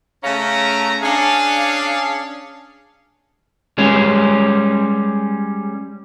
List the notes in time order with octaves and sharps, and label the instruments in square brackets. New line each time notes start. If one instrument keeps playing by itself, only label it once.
[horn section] C#3 A3 C#4 F5 A#5
C#4 D4 G#4 F5
[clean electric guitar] G3 G#3 C#4